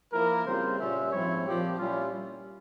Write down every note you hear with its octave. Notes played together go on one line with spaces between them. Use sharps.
F3 A#3 E4 A#4
C#3 G3 C4 F4 C5
A#2 G3 C#4 F4 E5
G#2 F3 C4 E4 C#5
A#2 F3 C4 F4 G4
A#2 G3 C#4 E4 F4